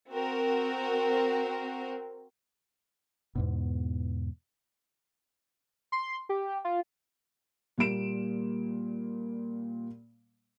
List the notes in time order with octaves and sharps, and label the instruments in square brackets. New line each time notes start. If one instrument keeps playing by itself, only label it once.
[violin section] C4 F#4 A#4
[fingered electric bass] E2 G#2 B2
[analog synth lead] C6
G4
F4
[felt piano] A#2 G3 A#3 D7 E7